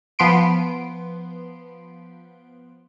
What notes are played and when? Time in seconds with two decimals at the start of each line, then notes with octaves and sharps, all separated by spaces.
0.19 F3 B3 C6 D7